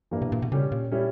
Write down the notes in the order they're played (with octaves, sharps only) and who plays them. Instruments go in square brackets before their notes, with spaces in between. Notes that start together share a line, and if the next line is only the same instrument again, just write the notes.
[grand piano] G2 E3 G3 A#3
[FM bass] B2
A#2
B2
[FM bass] C#3 [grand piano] G3 C#4 G4
[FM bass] A#2
[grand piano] G3 C#4 E4